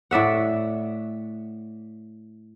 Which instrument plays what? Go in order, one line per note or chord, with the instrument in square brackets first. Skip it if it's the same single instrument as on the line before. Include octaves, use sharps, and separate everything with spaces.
[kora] A2 D5 E5 F#5